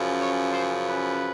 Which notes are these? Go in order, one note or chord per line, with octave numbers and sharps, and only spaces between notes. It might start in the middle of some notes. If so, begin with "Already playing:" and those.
Already playing: F#2 C#3 F3
C#5
C5
B4